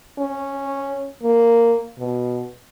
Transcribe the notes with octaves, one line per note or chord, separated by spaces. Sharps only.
C#4
A#3
B2